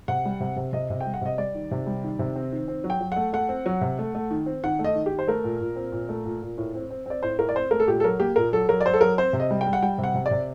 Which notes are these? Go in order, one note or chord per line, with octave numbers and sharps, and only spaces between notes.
C3 F#5
G3
C3
C3
C3 D#5
C3
G5
G3
F#5
C3 D#5
G3 D5
D#3
C3
G3
D#3
C3
C4
D#3
C4
F#3
G5
F#3
A3 F#5
A3 F#5
C4
F#3
C3
A3
A3
D#3
C4
D#3 F#5
A3
D#5
D#3
G4
D#3
C5
A3 A#4
A#2
A#2
C4
A#2
A3
A#2
A#2
A2
C4
C4
C4 D5
A2 C5
A2 A#4
D5
C4 C5
A3 A#4
A4
A#2 G4
A4
F#3 A#4
A#3 G4
A#2 A#4
F#3 A4
F#3 A#4
D5
F#3 C5
A4
F#3 A#4
C4 C5
C3
D#5
G3
G5
G3
F#5
G3 G5
C3
F#5
C3
D5
C3